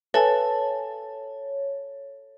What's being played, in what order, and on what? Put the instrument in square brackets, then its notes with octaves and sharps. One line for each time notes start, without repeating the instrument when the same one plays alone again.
[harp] A4 [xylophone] B4 G#5 [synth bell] C#5